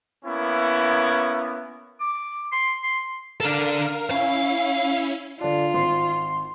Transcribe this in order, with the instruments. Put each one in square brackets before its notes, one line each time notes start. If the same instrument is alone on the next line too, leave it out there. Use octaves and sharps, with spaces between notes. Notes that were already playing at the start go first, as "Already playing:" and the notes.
[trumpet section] A#3 B3 C#4 E4
[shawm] D6
C6
C6
[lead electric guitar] D4 A4 [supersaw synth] A#4 F5
[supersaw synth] C#4 E4 [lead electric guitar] F5
[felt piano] D3 D4 [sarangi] F4
[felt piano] G#1 [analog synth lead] C6